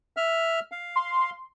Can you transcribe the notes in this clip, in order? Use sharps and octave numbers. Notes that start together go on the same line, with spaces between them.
E5 F6
F5
C6